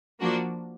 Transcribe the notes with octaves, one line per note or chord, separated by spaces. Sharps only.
F3 A#3 D4 F#4